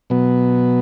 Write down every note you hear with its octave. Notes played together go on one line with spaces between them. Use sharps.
B2 F#3 B3